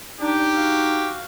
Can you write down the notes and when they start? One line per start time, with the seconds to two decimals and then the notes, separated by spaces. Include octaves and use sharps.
0.20 D4 D#4 G4
0.54 F#4 F5